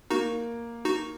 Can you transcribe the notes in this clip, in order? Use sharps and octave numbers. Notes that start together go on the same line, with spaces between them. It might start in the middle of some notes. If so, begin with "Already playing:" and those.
A#3 D#4 F#4
D#4 F#4